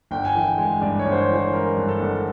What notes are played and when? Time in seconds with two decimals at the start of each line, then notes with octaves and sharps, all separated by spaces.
0.11 G1 G5
0.25 G#5
0.35 E3 G5
0.58 G#3
0.82 G2 D5
0.99 C#5
1.06 G1
1.12 C5
1.17 C#5
1.30 E3
1.35 C5
1.53 G#3 A#4
1.77 G2
1.88 A4
2.00 G1
2.15 A4